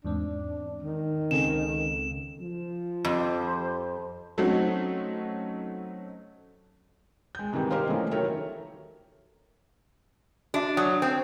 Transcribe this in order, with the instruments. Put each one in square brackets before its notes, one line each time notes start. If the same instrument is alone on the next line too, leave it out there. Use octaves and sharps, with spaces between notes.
[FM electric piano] E2 G#2 C4 [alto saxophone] D4
[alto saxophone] D#3
[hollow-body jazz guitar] C#2 C#3 G#5 [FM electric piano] C4 A4 [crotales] E7
[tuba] F3
[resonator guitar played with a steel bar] F2 [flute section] G4 C5 C6
[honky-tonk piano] F#3 A3 C4 C#4 D#4 F#4
[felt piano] G#3 G6
G#2 C3 D#3 E3 G3
G4 A#4 C5 D#5 F5
C3 E3 F3 A3 C4 C#4
D#3 F#3 A4 A#4 C#5 E5
[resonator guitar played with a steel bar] D4 [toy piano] F#4 E5
[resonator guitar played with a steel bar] F#3 [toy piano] D#6
[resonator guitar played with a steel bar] C4